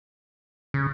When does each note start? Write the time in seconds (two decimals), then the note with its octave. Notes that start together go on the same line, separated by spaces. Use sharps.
0.74 C#3